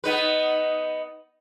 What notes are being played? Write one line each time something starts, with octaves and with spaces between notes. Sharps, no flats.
B3 D#4 B4